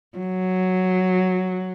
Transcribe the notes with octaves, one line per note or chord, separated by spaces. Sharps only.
F#3